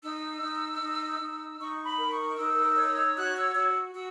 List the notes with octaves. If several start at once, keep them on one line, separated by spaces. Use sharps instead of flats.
D#4 E6
D#4
D#4
D#4
D#4 C#6
B5
A#4
C#6
D#4 E6
C#5
F#4 F#6
E6
F#4 E6
F#4 E6